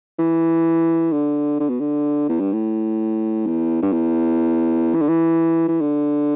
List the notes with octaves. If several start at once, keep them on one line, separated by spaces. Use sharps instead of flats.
E3
D3
D3
B2
D3
E2
G2
A2
E2
G2
E2
E3
D3
E3
E3
D3